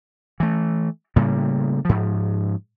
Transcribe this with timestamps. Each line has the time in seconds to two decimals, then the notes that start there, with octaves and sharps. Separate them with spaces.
0.40 E3 A3
1.16 A2 C#3 G3 A#3
1.85 G#2 F3